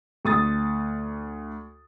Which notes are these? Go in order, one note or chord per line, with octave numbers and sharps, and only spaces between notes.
D2 D#6 A6